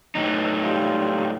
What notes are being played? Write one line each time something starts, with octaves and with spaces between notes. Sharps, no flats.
A2 F#3 D#4
G3 F4